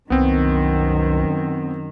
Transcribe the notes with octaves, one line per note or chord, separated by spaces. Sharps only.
C2 F#2 D#3 B3 C4